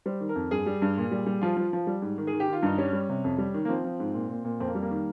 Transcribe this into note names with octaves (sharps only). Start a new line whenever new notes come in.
G3 C5
D#3
A#4
F2
G2 G#4
G3
G2
A#2
G3
G3
F3 F4
F3
F3
G3
G#2
D#3
G#4
D#3
G4
D#3 F4
G2 D#4
G3 C#4
G3
C3
F2
G3
D#3
A#3
F3 C4
F3
G#2
A#2
A#2
A#2
F2 C4
A#3
G3
A#3
D#3